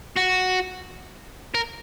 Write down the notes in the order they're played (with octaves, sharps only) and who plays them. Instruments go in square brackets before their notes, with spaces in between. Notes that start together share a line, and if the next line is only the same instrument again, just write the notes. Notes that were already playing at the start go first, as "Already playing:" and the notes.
[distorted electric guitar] F#4
A#4